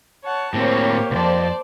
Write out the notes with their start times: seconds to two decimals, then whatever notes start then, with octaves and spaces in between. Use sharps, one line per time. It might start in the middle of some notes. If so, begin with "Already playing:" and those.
0.25 C#5 F#5 A5
0.54 A2 A#3 C4 G4 C5 C#5
1.11 C2 F2 C5 D5 A5